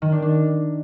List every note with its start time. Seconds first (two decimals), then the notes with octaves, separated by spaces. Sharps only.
0.02 D#3
0.12 D4
0.22 D4